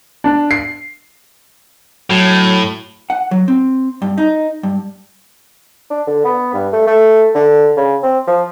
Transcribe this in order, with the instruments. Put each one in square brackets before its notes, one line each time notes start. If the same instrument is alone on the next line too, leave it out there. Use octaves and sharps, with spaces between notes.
[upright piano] D4
C7
[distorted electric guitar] A2 [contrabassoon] F#3
[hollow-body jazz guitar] F#5
F#3
C4
G2
D#4
G2
[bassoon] D4
D3
B3
G2
A3
A3
D3
C#3
C4
F3